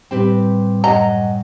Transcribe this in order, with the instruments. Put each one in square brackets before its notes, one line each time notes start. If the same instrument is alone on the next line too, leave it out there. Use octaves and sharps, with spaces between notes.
[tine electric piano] A2 G3 G5 [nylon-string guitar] C4 G4 B4
[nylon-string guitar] F#2 D#5 F#5 [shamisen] A#5